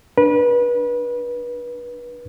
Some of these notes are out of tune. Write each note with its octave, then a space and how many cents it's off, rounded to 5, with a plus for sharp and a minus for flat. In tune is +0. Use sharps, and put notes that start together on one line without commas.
D4 +10 B4 -30